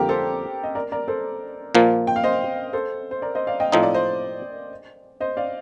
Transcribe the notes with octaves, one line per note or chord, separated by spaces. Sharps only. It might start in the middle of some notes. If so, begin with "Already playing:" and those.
Already playing: F2 D3 G3 A#3 G4 A#4
A4 C5
D#5
A#4 D5
A#4 D5
A4 C5
A#2 F3 A#3
G5
F5
C5 D#5
A4 C5
C5
A#4 D5
C5 D#5
D5 F5
D#5 G5
A2 F3 C4 D#4 D#5
D5
C5 D#5
C5 D#5
D5 F5